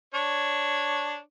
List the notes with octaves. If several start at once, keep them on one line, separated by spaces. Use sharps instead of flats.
D4 C#5